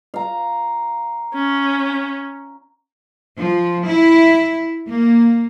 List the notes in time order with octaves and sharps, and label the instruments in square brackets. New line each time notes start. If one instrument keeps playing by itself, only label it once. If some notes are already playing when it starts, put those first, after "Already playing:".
[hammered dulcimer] F5 A#5
[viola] C#4
[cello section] F3
E4
A#3